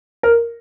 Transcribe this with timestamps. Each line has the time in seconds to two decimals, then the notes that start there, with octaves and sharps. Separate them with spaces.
0.23 A#4